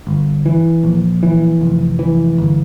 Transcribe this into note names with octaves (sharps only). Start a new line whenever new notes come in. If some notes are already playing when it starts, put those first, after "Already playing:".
G1
E3
A#1
E3
F1
E3
G1